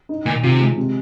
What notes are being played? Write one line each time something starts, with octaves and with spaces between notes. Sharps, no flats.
D#4
A#2 D#3
C3 F4
G#3
C3